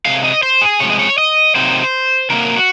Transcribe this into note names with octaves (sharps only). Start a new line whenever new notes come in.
C3 F3 G#3 F5
D#5
C5
G#4
C3 F3 G#3 C#5
D#5
C#5
D#5
C3 D#3 F#3 A#3 C5
C3 D#3 F#3 A#3 A#4
F#4